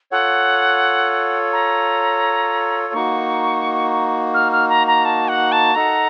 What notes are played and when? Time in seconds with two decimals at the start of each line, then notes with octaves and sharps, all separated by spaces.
0.11 F4 A4 C#5 F#5
1.53 A#5
2.93 A#3 D#4 F#4 C#6
4.34 F6
4.52 F6
4.69 A#5
4.87 A#5
5.05 A5
5.28 F#5
5.52 A5
5.75 D#4 A4 D#5 F#5 A#5